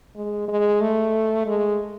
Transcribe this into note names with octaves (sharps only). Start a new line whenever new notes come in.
G#3
G#3
A3
G#3